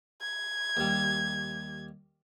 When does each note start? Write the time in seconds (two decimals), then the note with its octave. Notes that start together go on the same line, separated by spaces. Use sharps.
0.21 G#6
0.77 D#2 G3